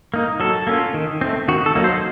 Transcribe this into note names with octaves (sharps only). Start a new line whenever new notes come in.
A#3 D#4
F#3 A4
A#3 C#4 F4
D#3
A3 C4
D#3 F#4
A4
F#3 A#3 D#4
C5